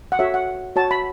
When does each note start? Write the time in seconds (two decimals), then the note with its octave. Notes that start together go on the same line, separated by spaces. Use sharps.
0.12 F#5
0.19 F#4 A4 C#5 E5
0.34 F#5
0.76 F#4 C#5 A5
0.91 B5